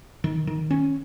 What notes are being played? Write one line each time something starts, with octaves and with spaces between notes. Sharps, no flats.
D#3
D#3
C#4